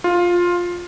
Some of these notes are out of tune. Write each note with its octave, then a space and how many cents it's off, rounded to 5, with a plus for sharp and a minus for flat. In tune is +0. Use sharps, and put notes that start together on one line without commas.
F4 +10